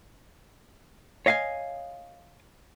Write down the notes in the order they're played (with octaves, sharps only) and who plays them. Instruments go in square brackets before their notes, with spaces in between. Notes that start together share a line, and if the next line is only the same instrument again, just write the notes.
[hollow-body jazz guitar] C#5 D#5 F5 F#5 G#5